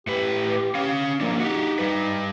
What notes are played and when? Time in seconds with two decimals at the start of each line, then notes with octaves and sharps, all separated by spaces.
0.07 A2 G4 B4
0.75 C#4 F5
1.21 F3 F#3 A#3 D4
1.39 D#4 F#4 G4
1.79 G3 B4